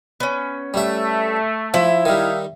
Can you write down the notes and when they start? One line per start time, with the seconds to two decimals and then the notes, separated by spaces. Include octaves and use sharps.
0.20 B3 C#4
0.74 G3 A3 E5
1.74 F3 E4
2.05 D#3 G3 D#4 E5 F5